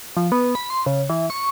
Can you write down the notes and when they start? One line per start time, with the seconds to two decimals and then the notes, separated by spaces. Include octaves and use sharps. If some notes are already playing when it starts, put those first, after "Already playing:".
0.17 F3
0.32 B3
0.55 B5
0.70 C6
0.86 C#3
1.10 E3
1.30 C#6